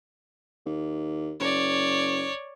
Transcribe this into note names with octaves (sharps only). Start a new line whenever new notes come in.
D#2
F#1 C#5 D5